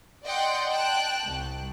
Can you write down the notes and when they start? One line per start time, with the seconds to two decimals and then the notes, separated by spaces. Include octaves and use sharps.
0.25 D5 D#5 F#5 G5 C6 G6
0.69 G5 A5 F#6
1.24 C2